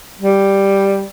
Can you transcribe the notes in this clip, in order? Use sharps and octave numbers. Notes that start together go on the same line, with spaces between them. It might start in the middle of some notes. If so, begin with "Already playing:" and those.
G3